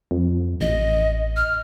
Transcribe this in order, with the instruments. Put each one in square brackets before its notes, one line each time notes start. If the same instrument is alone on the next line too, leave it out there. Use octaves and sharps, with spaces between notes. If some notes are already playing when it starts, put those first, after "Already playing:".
[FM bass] F2
[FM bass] A1 [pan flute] D#5
[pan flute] F6